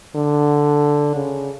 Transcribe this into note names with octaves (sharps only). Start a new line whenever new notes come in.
D3
C#3